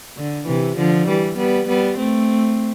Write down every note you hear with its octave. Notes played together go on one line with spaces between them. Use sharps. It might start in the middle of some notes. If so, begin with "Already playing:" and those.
D3
C3 E3
D3 F3
E3 G3
G3 B3
G3 B3
A3 C4